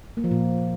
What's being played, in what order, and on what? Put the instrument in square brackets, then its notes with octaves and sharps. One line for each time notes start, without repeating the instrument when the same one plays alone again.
[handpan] A#3
F3
A#2